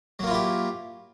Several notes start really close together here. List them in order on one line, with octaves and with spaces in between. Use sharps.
F#3 A#3 F4 E4 G4